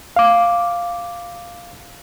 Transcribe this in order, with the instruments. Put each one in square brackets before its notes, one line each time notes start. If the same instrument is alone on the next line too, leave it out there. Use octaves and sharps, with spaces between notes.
[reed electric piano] F5 D6